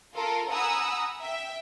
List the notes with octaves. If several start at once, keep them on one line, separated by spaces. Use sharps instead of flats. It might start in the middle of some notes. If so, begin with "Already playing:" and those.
F4 A4 A#4
F#5 G#5 A#5 B5 D#6 E6
E5 G5